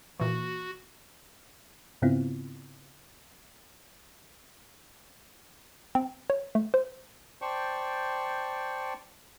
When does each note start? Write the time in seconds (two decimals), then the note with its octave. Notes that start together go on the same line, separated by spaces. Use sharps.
0.20 A#2 E3 F#4
2.02 G#2 C#3 B3 C4 E4 F4
5.95 C4
6.30 C#5
6.55 A3
6.74 C5
7.41 C5 D5 G5 A5 C#6